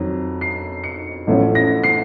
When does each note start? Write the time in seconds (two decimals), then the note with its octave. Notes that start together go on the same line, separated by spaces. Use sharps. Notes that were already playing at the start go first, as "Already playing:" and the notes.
Already playing: F2 D#3 F#3
0.41 C7
0.84 C#7
1.27 A1 A2 F3 A3 C#4
1.55 A#6
1.84 C7